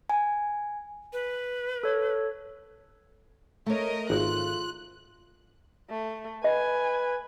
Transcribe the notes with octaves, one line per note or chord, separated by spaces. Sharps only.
G#5
B4
A4 C#5
A3 A#4 C#5 D#5
G#1 F4 F#6
A3
B4 D#5 G#5